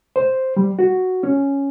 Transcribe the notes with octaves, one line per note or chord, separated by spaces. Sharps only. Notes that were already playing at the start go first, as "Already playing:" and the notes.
C5
G3
F#4
C#4